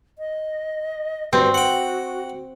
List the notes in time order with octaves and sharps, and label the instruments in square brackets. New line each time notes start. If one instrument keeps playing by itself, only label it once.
[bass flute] D#5
[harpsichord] G2 [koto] C4 [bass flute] F#4
[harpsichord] F#5 G5